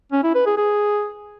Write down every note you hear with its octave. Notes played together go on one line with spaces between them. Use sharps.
C#4
E4
B4
G#4
G#4